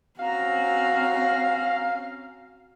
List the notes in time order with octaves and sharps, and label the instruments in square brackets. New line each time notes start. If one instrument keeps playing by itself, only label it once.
[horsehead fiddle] C4 C#4 [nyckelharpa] F#4 A#5 [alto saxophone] F5